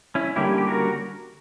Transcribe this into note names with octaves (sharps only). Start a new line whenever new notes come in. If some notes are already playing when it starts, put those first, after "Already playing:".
C#4 E4
D3 G3 A#3 C#4 E4 G4
G4
F#4 A#4